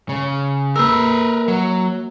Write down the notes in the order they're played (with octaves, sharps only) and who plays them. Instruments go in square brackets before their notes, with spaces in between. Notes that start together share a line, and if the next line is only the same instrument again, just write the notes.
[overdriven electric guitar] C#3
[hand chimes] A#3 E6 [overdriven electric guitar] A#4 B4
[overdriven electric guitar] F#3